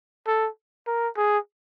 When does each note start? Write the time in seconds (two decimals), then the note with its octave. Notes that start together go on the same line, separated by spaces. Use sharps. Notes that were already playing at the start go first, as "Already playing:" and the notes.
0.27 A4
0.87 A#4
1.17 G#4